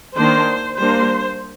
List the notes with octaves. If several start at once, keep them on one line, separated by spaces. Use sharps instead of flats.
D#3 A#3 D4 C5
G3 A#3 D4 C5